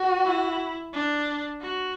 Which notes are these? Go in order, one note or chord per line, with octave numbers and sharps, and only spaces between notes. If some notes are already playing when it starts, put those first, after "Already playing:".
Already playing: F#4
E4
D4
F#4